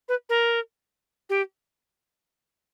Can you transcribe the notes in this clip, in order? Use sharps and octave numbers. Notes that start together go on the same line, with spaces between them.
B4
A#4
G4